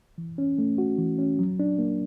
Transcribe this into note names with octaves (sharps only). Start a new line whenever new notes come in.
E3
C#4
A3
F#4
E3
C#4
F#3
D4
A#3